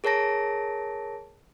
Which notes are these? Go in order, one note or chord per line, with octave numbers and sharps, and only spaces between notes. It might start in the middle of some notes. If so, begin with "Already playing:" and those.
G#4 A#4 C#5 A5 A#6 D7